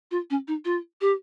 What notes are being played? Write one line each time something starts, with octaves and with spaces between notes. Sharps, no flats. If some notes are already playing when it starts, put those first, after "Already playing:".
F4
C#4
D#4
F4
G4